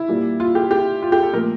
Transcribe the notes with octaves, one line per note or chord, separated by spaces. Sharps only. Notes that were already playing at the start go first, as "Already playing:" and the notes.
Already playing: E4
A#2 G3 A#3
F4
G4
G4
F4
G4
A4
A#2 F3 A3 A#4